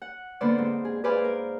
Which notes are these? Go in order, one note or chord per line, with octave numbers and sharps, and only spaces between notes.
F#5
D3 A#3 B3 B4 C5 D5
G#2 C4
G#4
G#4 B4 C5 D5 F5 G#5
A#4